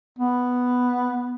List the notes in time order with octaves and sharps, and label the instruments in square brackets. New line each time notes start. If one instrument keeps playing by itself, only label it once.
[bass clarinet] B3